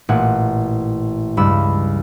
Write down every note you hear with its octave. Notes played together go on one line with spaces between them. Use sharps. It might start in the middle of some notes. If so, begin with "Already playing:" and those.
A1 A#2 F#5
C#2 G2 B5 E6